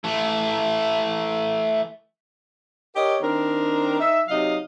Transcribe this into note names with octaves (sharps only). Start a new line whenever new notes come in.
E3 A3
G4 A#4 C#5 D#5
D#3 C4 D4 A#4
D#4 E5
C3 F#3 D#4 D#5 F5